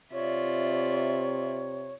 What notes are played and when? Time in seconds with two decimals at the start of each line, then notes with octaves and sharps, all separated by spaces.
0.12 C3 F4 C#5 D5 E5